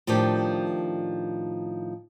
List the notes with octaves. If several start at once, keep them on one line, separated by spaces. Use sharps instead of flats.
A2 D#3 F3 D4 G4